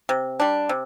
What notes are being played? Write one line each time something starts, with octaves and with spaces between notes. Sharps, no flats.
C3
G3 D4
C3